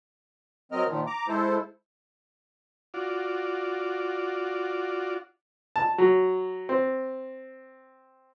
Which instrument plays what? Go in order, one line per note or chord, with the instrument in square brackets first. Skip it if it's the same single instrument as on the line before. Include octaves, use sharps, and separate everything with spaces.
[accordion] F#3 C4 A#4 D#5 F6
A#2 D#3 F3
A#5 D6
G#3 E4 A4 C5
[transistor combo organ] F4 F#4 D5
[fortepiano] A5
F#3
C4